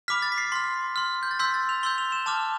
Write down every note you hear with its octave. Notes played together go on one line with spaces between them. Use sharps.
B5 D6 F6 B6
A6
B6
C7
C6 F6 B6
C6 F6
G6
A6
C6 E6 G6 B6
A6
F7
C6 E6 G6 G7
F7
E7
A5 D6 F6 E7